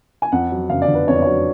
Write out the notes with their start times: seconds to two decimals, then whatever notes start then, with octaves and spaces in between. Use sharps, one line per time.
0.22 G#5
0.32 F2 F#5
0.51 F#3
0.69 F#1 F5
0.82 D5
0.88 D3
0.95 B4
1.08 F2 C#5
1.16 D5
1.23 F#3 C#5